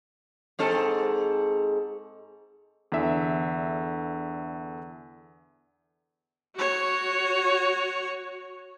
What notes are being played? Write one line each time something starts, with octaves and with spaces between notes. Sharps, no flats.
G#2 C4 A4
E2 D3 E5
F#4 C#5